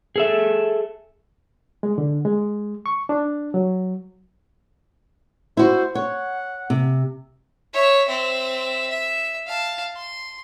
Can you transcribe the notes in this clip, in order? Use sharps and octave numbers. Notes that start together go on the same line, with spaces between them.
G#4 A4 E5
G#3
D3
G#3
C#6
D4
F#3
E4 F#4 C5
C#5 F#5
C3
C#5 E5
C4 E5
E5
F5 A5
C6